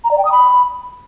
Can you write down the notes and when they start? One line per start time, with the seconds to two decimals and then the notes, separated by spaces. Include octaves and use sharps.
0.04 A#5
0.11 D5
0.18 G5
0.25 D#6
0.32 B5